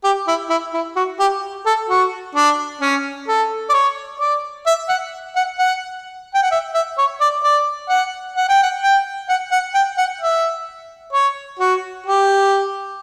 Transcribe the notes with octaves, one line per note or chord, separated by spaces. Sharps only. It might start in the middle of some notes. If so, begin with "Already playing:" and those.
G4
E4
E4
E4
F#4
G4
A4
F#4
D4
C#4
A4
D5
C#5
D5
E5
F#5
F#5
F#5
G5
F#5
E5
E5
C#5
D5
D5
F#5
F#5
G5
F#5
G5
F#5
F#5
G5
F#5
E5
C#5
F#4
G4